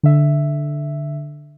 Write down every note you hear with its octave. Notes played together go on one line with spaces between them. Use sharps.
D3 E5